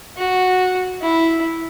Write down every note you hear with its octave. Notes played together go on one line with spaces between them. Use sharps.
F#4
E4